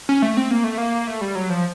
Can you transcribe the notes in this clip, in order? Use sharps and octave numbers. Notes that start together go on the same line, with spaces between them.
C#4
A3
C4
A#3
A3
A#3
A3
G3
F#3
F3